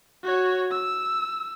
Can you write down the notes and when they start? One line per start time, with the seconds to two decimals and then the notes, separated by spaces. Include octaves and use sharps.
0.23 F#4 C#5
0.71 E6